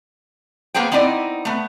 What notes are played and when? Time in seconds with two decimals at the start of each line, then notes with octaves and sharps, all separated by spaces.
0.74 A#3 B3 G#4 C5 G5
0.92 B3 C4 D#4 E4 D5 D#5
1.45 A3 B3